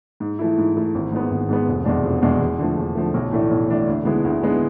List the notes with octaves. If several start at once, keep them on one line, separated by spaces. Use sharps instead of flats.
G#2
E3 A3 E4
G#2
E3 A3 E4
G#1
G#2 G#3 B3
G#1
G#2 G#3 B3
F1
E2 B2 G#3 D4
F1
E2 B2 G#3 D4
E2
D3 F3 A3
E2
D3 F3 A3
B1
A2 E3 A3 D4
B1
A2 E3 A3 D4
D2
D3 G#3 B3 E4
D2
D3 G#3 B3 E4